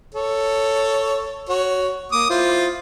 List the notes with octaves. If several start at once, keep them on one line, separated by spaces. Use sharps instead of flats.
A4 C#5
F#4 C#5
A#3 D6 D#6
E4 F4 C5